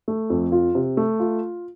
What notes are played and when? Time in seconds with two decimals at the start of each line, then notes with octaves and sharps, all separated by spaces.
0.08 A3
0.30 F2
0.52 F4
0.75 C3
0.97 A3
1.20 F4